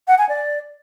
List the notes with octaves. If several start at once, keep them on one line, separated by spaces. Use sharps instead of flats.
F#5
G#5
D5